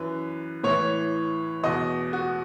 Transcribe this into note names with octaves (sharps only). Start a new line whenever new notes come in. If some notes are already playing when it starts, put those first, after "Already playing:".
Already playing: F#2 E3 B4
A2 E3 C#5
E2 B2 D#5
F#4